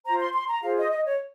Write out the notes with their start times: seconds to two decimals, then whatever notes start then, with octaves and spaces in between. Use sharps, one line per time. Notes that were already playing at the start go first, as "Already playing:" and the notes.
0.05 F4 C5 A#5
0.19 C6
0.34 C6
0.48 A#5
0.62 F4 G#4 C5 F5
0.77 D#5
0.91 D#5
1.05 C#5